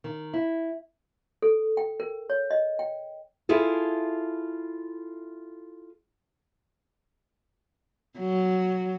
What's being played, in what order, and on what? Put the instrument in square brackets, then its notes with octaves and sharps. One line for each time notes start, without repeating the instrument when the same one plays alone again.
[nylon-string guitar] D#3
E4
[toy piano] A4
G5
A#4
C#5
D#5
G5
[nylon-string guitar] E4 F4 G#4 A4
[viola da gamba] F#3